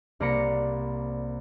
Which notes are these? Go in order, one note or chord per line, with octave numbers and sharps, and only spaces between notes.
C2 A#3 D5 A#5 B5 C#7